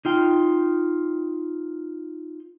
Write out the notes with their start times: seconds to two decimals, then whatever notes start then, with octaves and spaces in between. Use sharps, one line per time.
0.05 D#4 F4 G5